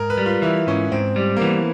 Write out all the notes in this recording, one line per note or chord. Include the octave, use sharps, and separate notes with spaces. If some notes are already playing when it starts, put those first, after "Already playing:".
Already playing: G#2 A#4
B4
G3
F4
E3 E4
G#2 C#4
G#2 C4
G3
A#3
E3 B3